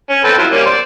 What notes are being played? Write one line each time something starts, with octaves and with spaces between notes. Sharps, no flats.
C#4
C4 A4 B4
F#3 E4 F4
G3 A#3 C#4
C5 D5